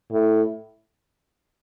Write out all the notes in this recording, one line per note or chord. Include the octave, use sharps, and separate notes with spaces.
A2